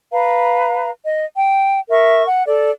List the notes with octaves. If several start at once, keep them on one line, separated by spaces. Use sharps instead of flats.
B4 F5 A#5
D#5
G5
A#4 E5 C#6
F#5
A4 D5